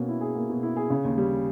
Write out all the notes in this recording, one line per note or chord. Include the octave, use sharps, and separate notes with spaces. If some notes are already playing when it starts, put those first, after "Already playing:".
Already playing: B2 A#3 C#4
E4
G#4
A#3
B2
E4
G#4
C#3
D#2
G3